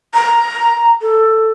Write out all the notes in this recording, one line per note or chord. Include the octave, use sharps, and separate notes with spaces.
A#5
A4